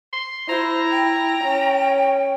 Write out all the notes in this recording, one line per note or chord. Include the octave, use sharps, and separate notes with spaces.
C6
E4 C5 A#5
G5
C#4